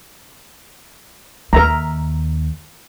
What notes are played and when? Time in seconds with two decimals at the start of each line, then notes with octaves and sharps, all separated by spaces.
1.53 D#2 A#4 E5 A#5